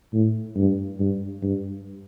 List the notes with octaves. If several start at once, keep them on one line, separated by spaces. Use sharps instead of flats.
A2
G2
G2
G2